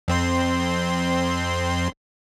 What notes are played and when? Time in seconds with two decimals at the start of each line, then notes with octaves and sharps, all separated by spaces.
0.08 F2 C4 C6